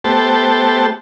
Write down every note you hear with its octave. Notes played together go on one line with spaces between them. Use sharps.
A3 B3 G4 C5 A5